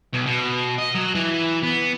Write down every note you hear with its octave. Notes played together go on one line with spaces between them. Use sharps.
B1
B2
D#5
F#3
E3
B3